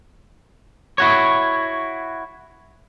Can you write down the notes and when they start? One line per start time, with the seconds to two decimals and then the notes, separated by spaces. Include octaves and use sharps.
0.98 E4 F#4 C#5